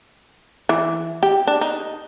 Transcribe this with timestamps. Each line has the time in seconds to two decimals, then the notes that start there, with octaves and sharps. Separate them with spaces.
0.69 E3
1.23 G4
1.47 D4
1.61 D#4